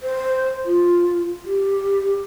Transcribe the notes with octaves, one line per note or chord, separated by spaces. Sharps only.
C5
F4
G4